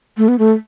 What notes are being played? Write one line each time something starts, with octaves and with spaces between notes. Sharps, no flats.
A3
B3
A3